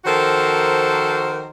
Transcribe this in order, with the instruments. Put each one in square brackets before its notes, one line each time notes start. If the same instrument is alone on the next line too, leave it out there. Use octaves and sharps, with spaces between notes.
[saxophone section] D#3 F3 F#4 A4 A#4 C5